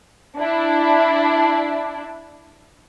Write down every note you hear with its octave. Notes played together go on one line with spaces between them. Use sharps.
D4 E4